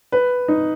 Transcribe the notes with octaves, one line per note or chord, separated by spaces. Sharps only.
B4
D#4